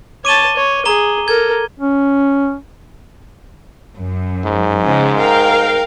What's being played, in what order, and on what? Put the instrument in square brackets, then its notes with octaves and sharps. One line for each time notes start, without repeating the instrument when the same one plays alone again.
[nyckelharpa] C#5 A5 [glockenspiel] D6 D#7 G7
[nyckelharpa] C#5
[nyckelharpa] G#4 [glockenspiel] A#5 G7
[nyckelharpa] A4 A#4 [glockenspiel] G#6
[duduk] C#4
[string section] F#2
[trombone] G#2
[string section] C#3 F3 G#3
A#4 F5 G5